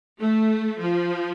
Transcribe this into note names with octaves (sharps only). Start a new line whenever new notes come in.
A3
F3